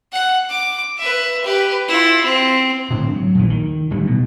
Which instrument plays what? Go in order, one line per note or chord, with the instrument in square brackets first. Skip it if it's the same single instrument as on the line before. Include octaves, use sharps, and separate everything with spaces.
[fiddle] F#5
D6
B4 E5
G4 B4
E4 F4
C4
[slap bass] G#2 D3 C4 D4
F#3
A#1 D#2 E3
D#3
D1 D3 G3
B2